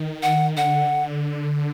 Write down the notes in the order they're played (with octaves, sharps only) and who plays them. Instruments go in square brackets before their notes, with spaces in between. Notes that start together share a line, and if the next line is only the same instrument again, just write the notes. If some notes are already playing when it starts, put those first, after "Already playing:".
Already playing: [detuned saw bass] D#3
[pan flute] F#5
[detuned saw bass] D3 [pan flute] F#5